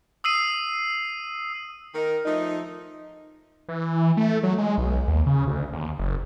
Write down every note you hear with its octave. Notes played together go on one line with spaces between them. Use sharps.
D#6 E6 C7 D#7
D#3 D#4 A#4
F3 A3 D#4
E3
A3
F#3
G#3
B1
D#2
C#3
D2
D#2
F#1